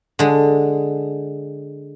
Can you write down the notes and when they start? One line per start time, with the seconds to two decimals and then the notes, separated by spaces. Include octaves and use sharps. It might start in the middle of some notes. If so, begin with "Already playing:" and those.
0.19 D3 G#3